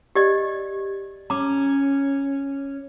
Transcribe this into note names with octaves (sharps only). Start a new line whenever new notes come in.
G4 D5 D#5
C#4 A#5 D6